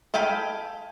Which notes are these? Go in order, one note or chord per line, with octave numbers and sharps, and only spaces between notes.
A4 F5 G5 G#5 B5